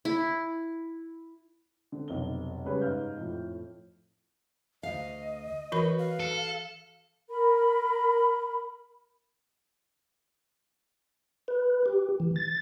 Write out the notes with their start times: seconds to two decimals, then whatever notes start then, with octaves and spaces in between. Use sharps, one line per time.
0.05 E4
1.92 D3 C4
2.08 F1 B1 C4 G7
2.64 C#3 G3 G#3 C#4 B4 C#5
2.81 G#2 D#5 F5 F6 G6
3.17 F2 A2
4.83 D2 D#5 F5
5.72 E3 F#4 A#4 B4 B5
5.99 F5
6.20 A4
7.28 A#4 B5
11.48 B4
11.86 G4
12.20 E3
12.36 A6